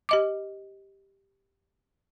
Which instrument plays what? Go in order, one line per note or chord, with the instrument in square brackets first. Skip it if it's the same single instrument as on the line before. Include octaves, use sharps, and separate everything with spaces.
[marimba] G4 D#5 D6